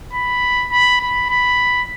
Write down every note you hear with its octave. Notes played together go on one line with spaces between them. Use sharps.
B5
B5
B5
B5